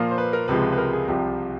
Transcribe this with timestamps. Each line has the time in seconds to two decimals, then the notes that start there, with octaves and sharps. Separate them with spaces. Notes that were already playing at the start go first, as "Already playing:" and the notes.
Already playing: A#2 F3 A#3
0.11 C5
0.18 B4
0.33 A#4
0.48 C#2 C3 F3 G#3 B4
0.73 B4
0.78 A#4
0.93 G#4
1.08 C2 C3 F3 G4